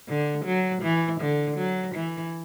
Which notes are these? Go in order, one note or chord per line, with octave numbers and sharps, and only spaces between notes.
D3
F#3
E3
D3
F#3
E3